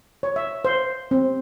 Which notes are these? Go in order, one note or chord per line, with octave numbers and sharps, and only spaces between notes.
C#5
E5
C5
C4